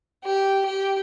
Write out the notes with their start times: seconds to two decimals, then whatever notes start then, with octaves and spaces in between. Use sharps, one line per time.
0.24 G4
0.65 G4